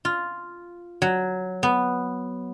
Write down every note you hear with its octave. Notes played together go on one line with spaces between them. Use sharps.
F4
F#3
B3